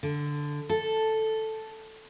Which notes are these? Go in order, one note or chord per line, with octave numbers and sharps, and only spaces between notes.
D3
A4